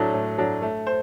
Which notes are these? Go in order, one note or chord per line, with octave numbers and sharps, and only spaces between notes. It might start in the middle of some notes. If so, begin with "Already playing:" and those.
Already playing: A2 F#3 A3 D4
A2
F#3 A3 D4
A3
C5